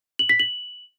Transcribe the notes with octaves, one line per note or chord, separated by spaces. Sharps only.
F#7
B6
F#7